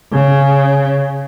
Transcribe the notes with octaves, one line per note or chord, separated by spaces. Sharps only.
C#3